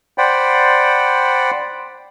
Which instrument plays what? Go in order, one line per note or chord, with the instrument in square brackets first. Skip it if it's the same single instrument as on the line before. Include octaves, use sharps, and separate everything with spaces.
[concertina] C5 D5 F#5 G5 B5